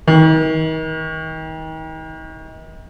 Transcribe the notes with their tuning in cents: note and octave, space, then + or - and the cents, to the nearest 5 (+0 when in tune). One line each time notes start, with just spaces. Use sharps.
D#3 +40